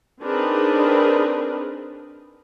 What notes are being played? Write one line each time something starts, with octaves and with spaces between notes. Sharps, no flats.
C4 D4 D#4 G#4 A#4 B4